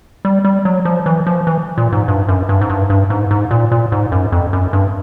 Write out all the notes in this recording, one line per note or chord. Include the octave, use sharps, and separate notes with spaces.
G3
G3
F#3
F3
E3
F3
E3
A#2
G#2
G2
F#2
G2
G#2
G2
G2
G#2
G#2
A#2
A#2
G#2
F#2
F2
F#2
G2